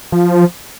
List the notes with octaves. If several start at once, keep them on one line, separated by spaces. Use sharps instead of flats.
F3